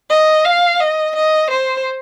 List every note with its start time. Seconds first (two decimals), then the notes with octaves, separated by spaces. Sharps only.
0.10 D#5
0.45 F5
0.80 D#5
1.16 D#5
1.51 C5